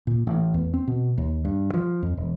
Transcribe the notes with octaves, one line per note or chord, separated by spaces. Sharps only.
A#2
A1
E2
C4
B2
D#2
G2
F3
F2
E1